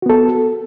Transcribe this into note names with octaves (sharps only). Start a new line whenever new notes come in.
B3 F#4 A4